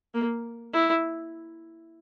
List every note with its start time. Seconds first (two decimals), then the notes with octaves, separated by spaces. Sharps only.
0.14 A#3
0.74 E4